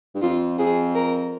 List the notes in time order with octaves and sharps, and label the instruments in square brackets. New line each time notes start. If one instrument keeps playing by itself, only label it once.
[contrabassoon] G2
[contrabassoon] F2 [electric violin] F4
[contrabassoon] F2 [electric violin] G#4
[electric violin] A#4